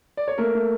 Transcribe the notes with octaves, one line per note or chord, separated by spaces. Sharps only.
D5
C#5
A3 A#3 A#4
A3